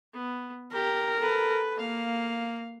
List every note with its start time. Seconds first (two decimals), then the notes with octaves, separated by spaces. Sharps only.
0.14 B3
0.74 G4 A#4
1.19 A4 B4
1.79 A#3 F5